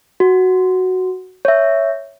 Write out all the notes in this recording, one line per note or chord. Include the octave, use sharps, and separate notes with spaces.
F#4
C#5 E5